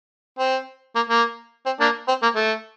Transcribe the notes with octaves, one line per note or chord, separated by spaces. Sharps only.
C4
A#3
A#3
C4
A#3 D4
C4
A#3
A3